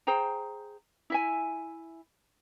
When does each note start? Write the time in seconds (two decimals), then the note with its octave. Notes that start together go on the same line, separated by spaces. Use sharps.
0.07 G#4 C5 G5 A#5
1.10 E4 E5 G#5